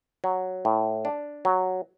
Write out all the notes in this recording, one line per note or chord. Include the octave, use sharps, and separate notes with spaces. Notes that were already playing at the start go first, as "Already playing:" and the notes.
F#3
A2
D4
F#3